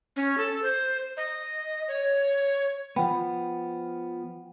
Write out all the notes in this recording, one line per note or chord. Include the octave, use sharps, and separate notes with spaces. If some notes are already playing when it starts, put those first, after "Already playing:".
C#4
A4
C5
D#5
C#5
F3 B3 F#5 G5 B5